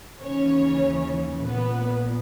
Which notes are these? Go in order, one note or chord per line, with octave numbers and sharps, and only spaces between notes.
D#2 C#3 E3 C#4 C#5
A#1 A#2 B3 B4